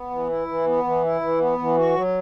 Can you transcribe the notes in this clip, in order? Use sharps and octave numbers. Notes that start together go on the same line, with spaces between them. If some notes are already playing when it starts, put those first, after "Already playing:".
Already playing: B3
E3
E4
E3
B3
E3
E4
E3
B3
E3
F#4
F#3